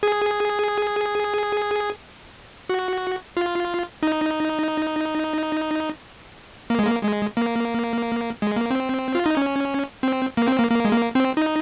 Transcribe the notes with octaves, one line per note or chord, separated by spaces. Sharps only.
G#4
F#4
F4
D#4
A#3
G#3
A#3
G#3
A#3
G#3
A#3
C4
F4
D#4
C#4
C4
A#3
C4
A#3
A#3
G#3
A#3
C4
D#4